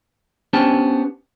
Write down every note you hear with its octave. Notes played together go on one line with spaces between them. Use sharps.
B3 C#4 D4 G4 C5 A5